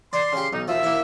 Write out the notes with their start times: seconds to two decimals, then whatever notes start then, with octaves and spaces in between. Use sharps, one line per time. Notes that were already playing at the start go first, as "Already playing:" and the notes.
0.13 D5 C6
0.33 C#3 G4
0.53 B1 D#4
0.68 D#2 B2 F3 E5
0.83 A#3 E4